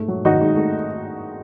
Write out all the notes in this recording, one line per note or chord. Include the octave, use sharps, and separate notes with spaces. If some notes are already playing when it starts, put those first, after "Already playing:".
Already playing: G#2 A3
F#3
D#3 D#4 F#4
G#2
A3